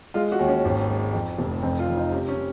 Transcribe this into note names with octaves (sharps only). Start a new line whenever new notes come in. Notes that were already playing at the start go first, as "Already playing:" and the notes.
G#3 F4
F#4
D#2
C#4
G#1
G#3
F2
F1
F2 C4
F4
F2
D#4
C3 C#4
C#4
C3